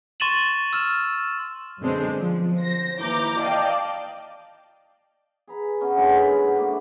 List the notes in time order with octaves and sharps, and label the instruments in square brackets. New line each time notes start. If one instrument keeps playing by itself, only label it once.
[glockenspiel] C6 C#6 A6 D#7 E7 F#7
E6 F6 E7
[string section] F#2 B2 D3 G#3 C4 D4
F3
C5 A#6
D#2 E3 A#5 D6 G6
D5 D#5 F5 G5 A5
[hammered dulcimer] G#4 B4 A#5
B3 C#4 E4
D3 F#3 G#3 B3
C#5 B5
B5
D3 A3 A#3 D6